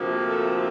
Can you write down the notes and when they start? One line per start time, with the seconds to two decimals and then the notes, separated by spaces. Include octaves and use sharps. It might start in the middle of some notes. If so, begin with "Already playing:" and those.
Already playing: D2 C3 F3 A#3
0.27 A4